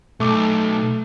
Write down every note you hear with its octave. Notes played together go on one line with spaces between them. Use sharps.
B1 A3 D6